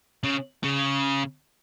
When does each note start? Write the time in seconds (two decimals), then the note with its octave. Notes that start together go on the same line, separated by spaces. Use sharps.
0.24 C#3
0.64 C#3